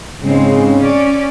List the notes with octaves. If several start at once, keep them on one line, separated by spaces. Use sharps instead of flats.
G#2 C#3 G#3 C4
C#4 D5